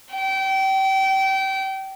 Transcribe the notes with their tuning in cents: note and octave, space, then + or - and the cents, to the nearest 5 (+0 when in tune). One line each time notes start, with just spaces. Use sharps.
G5 -30